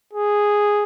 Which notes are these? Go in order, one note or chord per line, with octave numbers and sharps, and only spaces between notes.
G#4